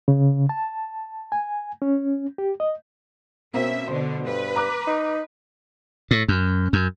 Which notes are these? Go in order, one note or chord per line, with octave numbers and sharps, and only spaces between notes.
C#3
A5
G#5
C#4
G4
D#5
B2 A#3 C4 C#4 E5
B2 D3 C5
G2 B4
A#5 D6 F#6
D#4
A2
F#2
F#2